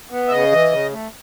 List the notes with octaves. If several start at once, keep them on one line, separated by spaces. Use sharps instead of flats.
B3
E5
C#3 D#5
E3
C#3
A3